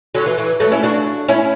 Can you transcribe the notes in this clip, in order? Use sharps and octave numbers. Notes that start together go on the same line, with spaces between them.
D3 F#3
E3
E3
F#3 A3
C#4 E4
D4 F#4
C#4 E4